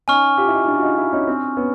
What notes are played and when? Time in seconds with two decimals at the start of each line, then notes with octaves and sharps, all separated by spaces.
0.08 C#4 D#4 G#5 C#6 F6
0.38 F4 G4
0.48 E4
0.53 D#4 F4
0.67 D4 E4
0.78 F#4
0.82 D#4 F4
0.97 D4 E4
1.12 C#4 D#4
1.27 C4 D4
1.57 B3 C#4